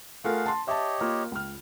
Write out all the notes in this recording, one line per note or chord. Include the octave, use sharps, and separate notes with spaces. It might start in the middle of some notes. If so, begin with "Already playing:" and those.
A3 F4 G#4 A#4 F5 F#5
A5 C6
G4 C#5 D#5 E5 A5
A#3 F4
C#2 F6